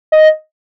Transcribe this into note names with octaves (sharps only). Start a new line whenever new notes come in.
D#5